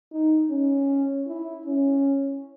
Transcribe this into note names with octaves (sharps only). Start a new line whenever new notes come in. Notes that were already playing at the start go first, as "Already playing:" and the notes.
D#4
C#4
E4
C#4